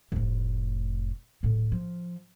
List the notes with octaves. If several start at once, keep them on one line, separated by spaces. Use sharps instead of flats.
F1 A2
D1 A2
F3